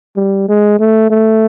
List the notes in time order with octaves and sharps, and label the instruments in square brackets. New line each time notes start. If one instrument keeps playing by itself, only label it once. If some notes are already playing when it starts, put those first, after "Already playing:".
[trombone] G3
G#3
A3
A3